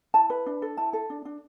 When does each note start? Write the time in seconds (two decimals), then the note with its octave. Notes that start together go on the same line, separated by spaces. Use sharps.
0.14 E4 A5
0.30 B4
0.46 D4
0.62 A4
0.77 E4 A5
0.93 A4
1.10 D4
1.25 D4